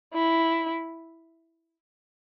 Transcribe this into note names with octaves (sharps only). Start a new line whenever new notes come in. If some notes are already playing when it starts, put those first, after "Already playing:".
E4